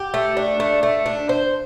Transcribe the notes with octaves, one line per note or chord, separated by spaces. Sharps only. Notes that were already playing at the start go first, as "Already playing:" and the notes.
Already playing: G4
A3
D4
A3
A3
D4
C5